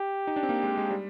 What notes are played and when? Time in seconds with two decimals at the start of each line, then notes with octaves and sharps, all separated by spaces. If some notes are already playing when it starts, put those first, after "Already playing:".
Already playing: G4
0.27 D#4
0.36 D4
0.43 C4
0.49 A#3
0.63 G#3
0.77 G#3
0.91 G3